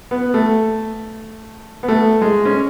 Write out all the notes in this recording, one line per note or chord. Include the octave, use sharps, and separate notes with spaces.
B3
A3
B3
A3
G#3
C#4